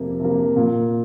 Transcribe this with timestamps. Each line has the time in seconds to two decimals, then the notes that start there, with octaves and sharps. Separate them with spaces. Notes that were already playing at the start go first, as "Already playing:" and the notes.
Already playing: F2 C3 A#3
0.20 C3 A#3
0.56 A#2